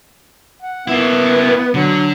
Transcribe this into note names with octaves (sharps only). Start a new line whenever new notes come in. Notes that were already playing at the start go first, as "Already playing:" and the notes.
F#5
A#3 B3 E4
D3 F#3